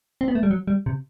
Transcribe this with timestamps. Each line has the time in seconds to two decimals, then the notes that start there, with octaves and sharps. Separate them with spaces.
0.21 C4
0.28 B3
0.35 A3
0.43 G3
0.51 F#3
0.67 G3
0.86 C3